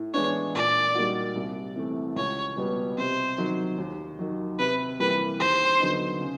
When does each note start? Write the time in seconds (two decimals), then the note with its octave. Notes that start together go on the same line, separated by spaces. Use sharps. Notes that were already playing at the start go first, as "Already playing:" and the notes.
Already playing: A2
0.14 E3 G#3 B3 D4 C#5
0.55 A#2 D5
0.95 G3 A#3 D#4 F#4
1.35 C2
1.76 C3 E3 A3
2.16 C#2 C#5
2.57 B2 G3 B3
2.98 C3 C5
3.38 D#3 F#3
3.78 D#2
4.19 D#3 F#3
4.59 C3 B4
5.00 E3 G3 A#3 B4
5.40 D#2 C5
5.80 D3 F#3 B3 D#4
6.21 C#3